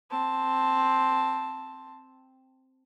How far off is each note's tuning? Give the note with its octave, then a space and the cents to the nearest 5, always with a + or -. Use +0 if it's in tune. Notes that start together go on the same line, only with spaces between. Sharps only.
C4 +0 A5 +0